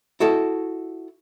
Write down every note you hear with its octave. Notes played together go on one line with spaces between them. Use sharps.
E4 F#4 A4 D#5